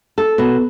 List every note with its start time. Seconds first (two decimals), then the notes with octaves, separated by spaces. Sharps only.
0.18 A4
0.38 B2